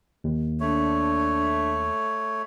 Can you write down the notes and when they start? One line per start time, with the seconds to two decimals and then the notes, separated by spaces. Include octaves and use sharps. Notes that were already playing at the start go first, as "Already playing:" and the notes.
0.24 D#2
0.60 A3 D4 C#5